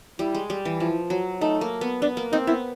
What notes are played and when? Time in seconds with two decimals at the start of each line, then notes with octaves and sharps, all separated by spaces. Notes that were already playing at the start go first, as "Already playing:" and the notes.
0.19 G3 E4
0.35 G#3
0.50 G3
0.65 E3
0.80 F3 E4
1.10 F#3
1.41 A3 D#4
1.61 A#3
1.81 B3
2.02 B3 D4
2.17 A#3
2.32 C4 D#4
2.47 B3 E4